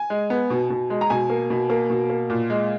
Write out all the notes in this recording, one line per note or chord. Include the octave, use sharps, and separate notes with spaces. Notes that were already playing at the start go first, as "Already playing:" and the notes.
Already playing: G#5
G#3
B3
B2
B2
G#3
A#5
B2 G#5
A#3
B2
A#3
B2
A#3
A#2
G#3